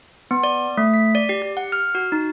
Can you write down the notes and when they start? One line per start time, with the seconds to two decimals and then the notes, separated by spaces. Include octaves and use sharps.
0.31 B3
0.43 D5
0.77 A3
0.94 B6
1.15 D5
1.29 G4
1.42 G4
1.57 F#5
1.72 F6
1.95 F#4
2.12 D#4